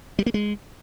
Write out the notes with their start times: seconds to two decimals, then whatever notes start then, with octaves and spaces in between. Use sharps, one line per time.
0.19 G3
0.26 A#3
0.34 G#3